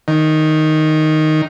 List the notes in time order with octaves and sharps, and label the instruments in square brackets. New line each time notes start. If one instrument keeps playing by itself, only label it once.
[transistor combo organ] D#3